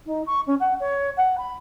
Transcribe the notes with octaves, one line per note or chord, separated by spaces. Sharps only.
D#4
C#6
C#4
F#5
C#5
F#5
B5